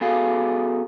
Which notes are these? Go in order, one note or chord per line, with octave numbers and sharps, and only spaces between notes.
B3 F#4 G#4 A4 F5